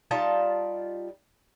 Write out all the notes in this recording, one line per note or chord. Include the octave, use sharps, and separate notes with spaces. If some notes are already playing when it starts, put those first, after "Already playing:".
G3 D#4 F4 A5